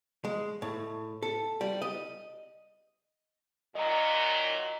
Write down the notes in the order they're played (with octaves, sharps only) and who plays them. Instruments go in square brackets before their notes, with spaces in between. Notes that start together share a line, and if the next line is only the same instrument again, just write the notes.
[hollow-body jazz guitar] G#3
A2
A4
G3
D#5
[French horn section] A#2 D#3 F#3 [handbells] D#5 A#5